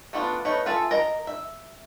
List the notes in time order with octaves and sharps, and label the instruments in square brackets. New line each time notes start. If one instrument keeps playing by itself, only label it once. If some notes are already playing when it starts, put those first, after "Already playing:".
[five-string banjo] A3 B3 D4 F4
A3 B3 D#4 B4 C#5
F4 G#4 A4 E5
A#4 D#5 A#5
E5